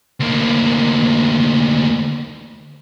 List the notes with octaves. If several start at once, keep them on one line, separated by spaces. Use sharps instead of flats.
D2 A#3